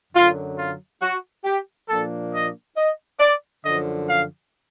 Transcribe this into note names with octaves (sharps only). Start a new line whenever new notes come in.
F#2 D3 F#3 F4
F4
F#4
G4
A#2 F3 A#3 D4 A4
D#5
D#5
D5
F#2 D3 F3 D#5
F5